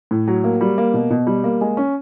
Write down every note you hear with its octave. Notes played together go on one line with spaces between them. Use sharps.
A2
F#3
A#3
G3
A#3
B2
B2
G3
A#3
G#3
C#4